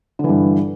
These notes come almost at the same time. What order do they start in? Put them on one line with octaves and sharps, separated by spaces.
D3 E3 G2